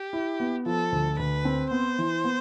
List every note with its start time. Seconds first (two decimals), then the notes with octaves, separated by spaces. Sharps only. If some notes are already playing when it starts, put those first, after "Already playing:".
Already playing: G4
0.13 E4
0.40 B3
0.66 F3 A4
0.92 D2
1.19 D2 B4
1.45 C4
1.71 B3 C5
1.99 E3
2.24 B3